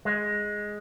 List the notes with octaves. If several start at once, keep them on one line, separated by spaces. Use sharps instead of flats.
G#3